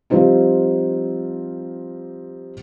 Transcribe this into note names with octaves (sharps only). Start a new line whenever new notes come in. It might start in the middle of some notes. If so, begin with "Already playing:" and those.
F3 G3 C4 D#4 F4